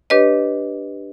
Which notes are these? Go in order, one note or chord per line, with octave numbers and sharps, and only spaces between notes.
D4 G4 B4 C#5 D#5